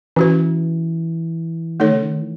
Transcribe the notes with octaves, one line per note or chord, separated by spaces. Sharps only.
E3 C#4 F#4 B4
D#3 A3 D#4 A4 C#5
C#3
D#3
E3